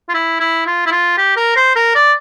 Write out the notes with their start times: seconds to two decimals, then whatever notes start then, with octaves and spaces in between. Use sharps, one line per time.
0.09 F4
0.14 E4
0.40 E4
0.66 F4
0.86 E4
0.91 F4
1.17 G4
1.37 A#4
1.56 C5
1.75 A#4
1.95 D5